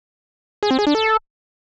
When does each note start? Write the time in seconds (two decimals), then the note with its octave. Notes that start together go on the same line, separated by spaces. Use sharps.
0.63 G#4
0.71 C4
0.79 G#4
0.87 D4
0.95 A4